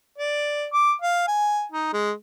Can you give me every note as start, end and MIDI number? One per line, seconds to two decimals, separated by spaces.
0.18 0.67 74
0.73 0.94 86
1.02 1.26 77
1.28 1.64 80
1.72 1.92 63
1.93 2.12 56